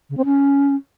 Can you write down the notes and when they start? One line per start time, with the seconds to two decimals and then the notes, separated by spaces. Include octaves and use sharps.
0.10 C#3
0.17 C4
0.25 C#4